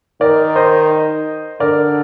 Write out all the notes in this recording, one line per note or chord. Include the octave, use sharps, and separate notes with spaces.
D#3 A#4 D5
C5 D#5
D3 A#4 D5